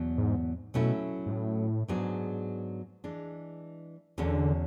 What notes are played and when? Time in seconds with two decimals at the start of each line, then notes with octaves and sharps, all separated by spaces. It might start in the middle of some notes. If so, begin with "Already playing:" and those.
Already playing: E2 B2 F#3
0.18 G#2
0.74 B2 F#3 A3 C#4 E4
1.26 G#2
1.32 A2
1.88 G#2 F#3 B3 D4 G#4
3.04 E3 G#3 D4
4.18 E2 B2 D3 G#3 C#4